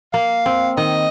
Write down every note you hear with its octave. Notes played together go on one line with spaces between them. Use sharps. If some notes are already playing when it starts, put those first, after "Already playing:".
A#3 F5
C4
D#3 D#5